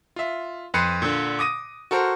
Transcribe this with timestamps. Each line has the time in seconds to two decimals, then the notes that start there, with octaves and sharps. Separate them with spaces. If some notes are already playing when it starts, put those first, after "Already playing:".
0.16 F4 E5
0.74 F2 B4 C6 F#6 C7 C#7
1.02 A#2 D3
1.39 D6 D#6 A#6 D#7
1.91 F#4 A4 A#4 C5